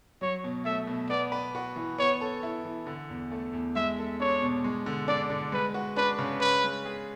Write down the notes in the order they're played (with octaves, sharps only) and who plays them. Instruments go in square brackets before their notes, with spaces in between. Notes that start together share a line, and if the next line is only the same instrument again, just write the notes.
[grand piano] F#3 [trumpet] C#5
[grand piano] B2
[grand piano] A3 [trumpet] E5
[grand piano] B2
[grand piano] B3 [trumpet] D5
[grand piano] B4
F#4
E3
[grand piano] B3 [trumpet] C#5
[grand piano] A4
E4
E3
D3
E2
A3
E2
[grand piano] G#3 [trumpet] E5
[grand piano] A4
[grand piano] D4 [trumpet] C#5
[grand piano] B2
G#3
D3
[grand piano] D4 [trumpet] D5
[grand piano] D3
[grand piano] G#3 [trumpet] B4
[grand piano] F#4
[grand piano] D4 [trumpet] B4
[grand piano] C#3
[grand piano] C#4 [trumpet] B4
[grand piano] G#3
G#4